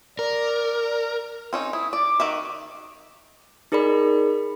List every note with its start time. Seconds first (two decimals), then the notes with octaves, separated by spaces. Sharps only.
0.19 A#4 D5
1.53 C4 C#4 D#4
1.73 E4 D#6
1.93 D5 D6
2.20 D#3 F#4 E5
3.72 D#4 G#4 A#4 D5 B5